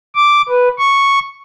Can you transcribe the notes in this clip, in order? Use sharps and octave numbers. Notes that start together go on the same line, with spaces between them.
D6
B4
C#6